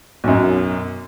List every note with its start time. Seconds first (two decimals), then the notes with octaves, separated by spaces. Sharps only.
0.24 B1 F#2